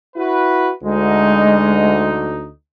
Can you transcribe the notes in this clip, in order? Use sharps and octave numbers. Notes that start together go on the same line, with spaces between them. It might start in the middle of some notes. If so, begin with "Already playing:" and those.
E4 F#4 B4
D2 G#3 D#4